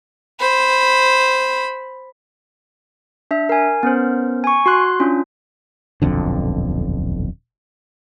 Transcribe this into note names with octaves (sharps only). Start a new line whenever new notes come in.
C5 B5
D4 E5
A#4 G#5
B3 C#4 A#4 C5
G#5 C#6
F#4 C6 F#6
C#4 D4 F4
D#1 B1 F2 D3